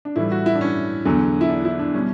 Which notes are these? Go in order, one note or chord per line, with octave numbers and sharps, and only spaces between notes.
D4
A2 E3 G3 E4
F#4
E4
D4
C#4
E2 D3 F#3
E4
D4
E4
D4
B2 G3 C#4